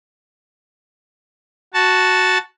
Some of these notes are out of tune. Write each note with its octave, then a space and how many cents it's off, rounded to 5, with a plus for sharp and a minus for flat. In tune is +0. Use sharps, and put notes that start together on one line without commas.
F#4 +0 A5 +0